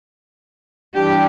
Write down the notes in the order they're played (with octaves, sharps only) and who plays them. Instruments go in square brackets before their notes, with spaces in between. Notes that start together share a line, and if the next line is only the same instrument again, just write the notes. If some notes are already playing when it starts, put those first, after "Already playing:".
[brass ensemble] E3 G3 D4 [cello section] G4